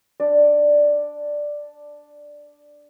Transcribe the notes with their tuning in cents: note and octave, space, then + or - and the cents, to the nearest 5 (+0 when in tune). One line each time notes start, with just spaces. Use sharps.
D4 +0 D5 +5